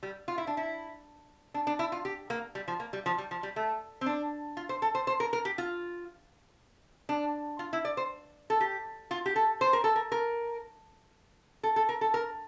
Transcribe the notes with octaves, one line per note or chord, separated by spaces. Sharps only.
G3
F4
E4
D4
E4
D4
D4
E4
F4
G4
A#3
G3
F3
A#3
G3
F3
G3
F3
G3
A3
C4
D4
F4
C5
A4
C5
C5
A#4
A#4
G4
F4
D4
F4
E4
D5
C5
A4
G4
F4
G4
A4
C5
A#4
A4
A#4
A#4
A4
A4
A#4
A4
A#4